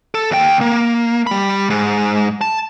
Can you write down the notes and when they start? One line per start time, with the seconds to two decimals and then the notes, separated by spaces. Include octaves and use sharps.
0.15 A4
0.31 D#2 G5
0.61 A#3
1.27 G3 B5
1.70 G#2
2.41 A5